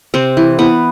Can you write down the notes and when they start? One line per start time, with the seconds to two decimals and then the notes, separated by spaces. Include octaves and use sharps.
0.14 C3 C4
0.37 E3
0.59 E3 B3